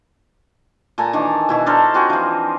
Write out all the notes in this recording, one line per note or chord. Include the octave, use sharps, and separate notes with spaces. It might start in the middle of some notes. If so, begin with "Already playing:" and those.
A#2 A4 G#5 A#5
D#3 E3 D4
B2 E4 F#4
D4 A4 A#4 C5
C4 F4 F#4 G#4
E3 F3